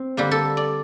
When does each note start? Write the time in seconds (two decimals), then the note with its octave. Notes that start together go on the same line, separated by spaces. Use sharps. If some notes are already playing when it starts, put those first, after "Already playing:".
Already playing: C4
0.17 D3 G3 A#3 G4
0.31 A4
0.57 D5